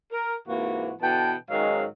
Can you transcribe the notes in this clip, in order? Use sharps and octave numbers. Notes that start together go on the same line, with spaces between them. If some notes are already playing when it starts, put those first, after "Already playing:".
A#4
G#2 C3 E3 A#3 F#4
B2 D3 E3 G5 A5
G#2 D#3 F#3 G#3 C#4 F5